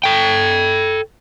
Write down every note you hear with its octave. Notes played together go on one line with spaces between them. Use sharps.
A4 G5